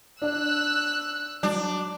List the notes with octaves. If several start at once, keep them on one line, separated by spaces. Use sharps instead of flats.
D4 D5 E6 F#6
F#3 D4